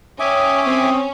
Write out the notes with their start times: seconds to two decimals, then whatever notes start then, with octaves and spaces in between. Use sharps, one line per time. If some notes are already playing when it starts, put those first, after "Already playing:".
0.20 C#4 E5 G5 G#5 D6 D#6
0.66 C4